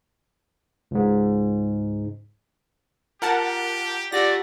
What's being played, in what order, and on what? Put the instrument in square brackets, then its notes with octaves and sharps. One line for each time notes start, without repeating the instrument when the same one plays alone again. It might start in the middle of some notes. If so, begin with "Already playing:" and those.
[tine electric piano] C#2 G#2
[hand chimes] F4 [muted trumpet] G4 [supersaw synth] A#4 F#5 A5
[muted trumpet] A3 [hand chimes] F4 G4 F#5 [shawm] D5 [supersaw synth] A#6